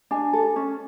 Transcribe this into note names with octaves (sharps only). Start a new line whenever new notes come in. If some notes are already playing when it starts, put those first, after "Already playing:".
D4 G#5
A4
C#4